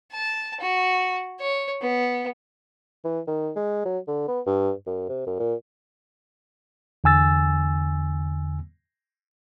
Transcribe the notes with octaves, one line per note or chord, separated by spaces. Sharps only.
A5
F#4
C#5
B3
E3
D#3
G#3
F#3
D3
B3
G2
F#2
C3
F#2
A#2
E2 D3 G#5 E6 A6